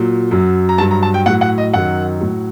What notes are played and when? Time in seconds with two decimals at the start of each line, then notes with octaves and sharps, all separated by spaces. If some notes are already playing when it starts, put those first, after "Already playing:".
Already playing: A#2 F#3
0.31 F#2 F#3
0.69 A#5
0.78 G2 F#3 A5
0.91 A#5
1.03 A5
1.14 G5
1.26 A2 F#3 F#5
1.41 F#5
1.58 D#5
1.73 F#2 D#3 F#3 F#5
2.21 A2 F#3